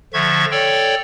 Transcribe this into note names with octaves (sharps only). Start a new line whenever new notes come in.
D3 F3 E5 C#6 G#6
A4 C#5 D5 G5